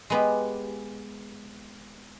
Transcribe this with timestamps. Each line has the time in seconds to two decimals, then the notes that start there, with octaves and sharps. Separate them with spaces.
0.10 G#3 B3 G4